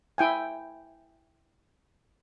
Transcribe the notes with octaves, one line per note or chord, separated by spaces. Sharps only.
E4 G5 G#5